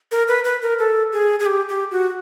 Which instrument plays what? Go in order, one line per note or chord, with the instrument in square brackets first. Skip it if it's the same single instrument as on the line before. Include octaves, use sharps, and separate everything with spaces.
[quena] A#4
B4
B4
A#4
A4
G#4
G#4
G4
G4
F#4